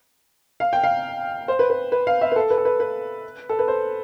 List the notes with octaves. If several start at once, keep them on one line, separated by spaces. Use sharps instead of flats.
F5
G5
F5
C5
B4
B4
B4
F5
E5
B4
A4
B4
A4
B4
B4
A4
B4
C5